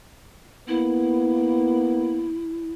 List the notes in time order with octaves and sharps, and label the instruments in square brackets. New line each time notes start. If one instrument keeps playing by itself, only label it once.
[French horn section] A#3 B3 [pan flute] E4